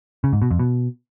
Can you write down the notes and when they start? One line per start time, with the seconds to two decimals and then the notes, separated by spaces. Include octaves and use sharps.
0.24 C#3
0.33 G#2
0.42 B2
0.50 F2
0.59 B2